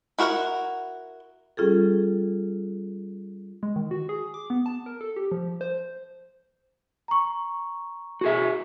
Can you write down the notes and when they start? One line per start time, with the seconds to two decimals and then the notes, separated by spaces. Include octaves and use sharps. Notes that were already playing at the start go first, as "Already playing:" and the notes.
0.19 E4 F#4 A#4 D#5 F#5
1.57 G3 C#4 F4 G#4 A4
3.63 G#3
3.76 D#3
3.91 F#4
4.09 G#4
4.34 D6
4.50 B3
4.66 A5
4.86 A#4
5.01 A4
5.16 G4
5.32 F3
5.61 C5
7.08 A#5 C#6
8.21 F#4 G#4 E5